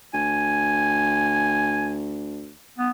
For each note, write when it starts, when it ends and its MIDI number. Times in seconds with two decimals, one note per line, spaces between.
0.14 2.51 38
0.14 1.94 80
2.78 2.90 59